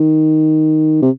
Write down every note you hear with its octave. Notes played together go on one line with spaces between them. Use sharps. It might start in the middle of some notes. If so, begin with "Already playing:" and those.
Already playing: D#3
C3